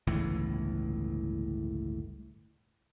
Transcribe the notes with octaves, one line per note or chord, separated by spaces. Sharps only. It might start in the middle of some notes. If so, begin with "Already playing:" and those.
G1 C#2 A2 E3